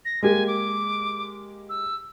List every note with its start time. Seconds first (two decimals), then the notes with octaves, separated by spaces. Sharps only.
0.05 A#6
0.23 G#3 A#3 G4 G#5
0.48 D6
1.70 E6